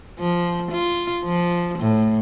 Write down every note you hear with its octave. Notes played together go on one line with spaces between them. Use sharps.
F3
F4
F3
A2